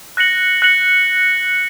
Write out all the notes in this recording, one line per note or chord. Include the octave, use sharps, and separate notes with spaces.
F#6 A#6 C#7 F#7
F#6 A#6 C#7 F#7